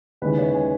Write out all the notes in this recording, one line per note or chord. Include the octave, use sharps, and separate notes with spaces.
D#2 C#3 G#3 C#4 E4 B4
C#5
G#5